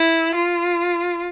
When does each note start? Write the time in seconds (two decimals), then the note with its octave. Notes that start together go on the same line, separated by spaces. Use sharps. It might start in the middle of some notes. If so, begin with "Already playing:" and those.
Already playing: E4
0.35 F4